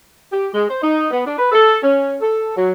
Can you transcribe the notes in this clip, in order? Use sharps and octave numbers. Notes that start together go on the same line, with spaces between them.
G4
G#3
C5
D#4
B3
D4
B4
A4
C#4
A4
F#3